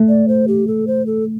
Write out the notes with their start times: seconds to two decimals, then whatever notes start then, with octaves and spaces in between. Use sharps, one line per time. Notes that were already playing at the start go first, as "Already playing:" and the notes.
Already playing: A3
0.08 D5
0.28 C5
0.48 G4
0.67 A4
0.87 C5
1.06 A4